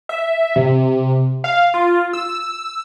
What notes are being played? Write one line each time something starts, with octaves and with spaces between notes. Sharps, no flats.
E5
C3
F5
F4
E6